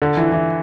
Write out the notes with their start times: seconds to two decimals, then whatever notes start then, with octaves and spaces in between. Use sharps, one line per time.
0.02 D3
0.17 E3
0.32 E3